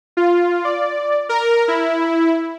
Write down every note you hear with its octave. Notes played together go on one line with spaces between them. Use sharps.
F4
D5
A#4
E4